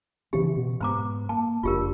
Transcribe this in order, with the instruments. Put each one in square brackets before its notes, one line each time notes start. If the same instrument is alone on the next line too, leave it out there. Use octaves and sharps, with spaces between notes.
[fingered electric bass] C#3 E3 B3 [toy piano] G4
[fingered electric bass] B2
[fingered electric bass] G#2 B3 [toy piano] C5 A#5 D6
[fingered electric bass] A#3 [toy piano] A5
[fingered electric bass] F1 C#2 D4 [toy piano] F4 G4 A#4